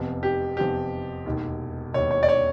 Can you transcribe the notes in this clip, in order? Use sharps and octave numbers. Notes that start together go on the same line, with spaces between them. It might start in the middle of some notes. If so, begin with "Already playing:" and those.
Already playing: F1 E2 C3 F3
G4
F1 E2 C3 F3 G4
E1 D#2 D#3
E1 D#2 D#3 C#5
C#5
D5
C#5